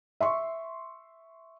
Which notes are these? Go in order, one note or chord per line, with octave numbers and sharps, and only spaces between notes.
E5 C6 C#6